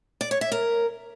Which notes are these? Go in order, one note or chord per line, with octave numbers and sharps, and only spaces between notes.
D5
C#5
E5
A#4